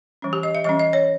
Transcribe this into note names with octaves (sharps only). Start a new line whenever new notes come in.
E3 G3 C#4
G4
D#5
E5
E3 G3 C#4 D#5
D#5
C#5